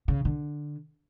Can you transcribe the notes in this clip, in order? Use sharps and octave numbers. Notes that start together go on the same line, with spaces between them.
C#3
D3